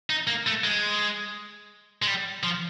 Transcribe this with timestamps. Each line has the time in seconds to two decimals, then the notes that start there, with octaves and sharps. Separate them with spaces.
0.10 D#4
0.27 A#3
0.46 A3
0.64 G#3
2.02 G#3
2.07 G3
2.43 F3